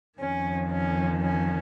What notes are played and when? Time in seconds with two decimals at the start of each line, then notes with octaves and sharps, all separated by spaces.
0.18 F2 D#3 C#4
0.69 C#4
1.21 C#4